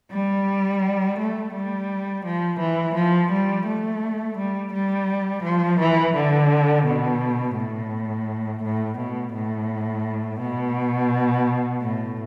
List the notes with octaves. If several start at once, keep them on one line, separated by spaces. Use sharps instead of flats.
G3
A3
G3
F3
E3
F3
G3
A3
G3
G3
F3
E3
D3
B2
A2
A2
B2
A2
B2
A2